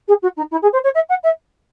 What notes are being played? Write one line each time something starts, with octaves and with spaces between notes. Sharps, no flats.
G#4
F#4
D#4
E4
G#4
C5
C#5
E5
F#5
E5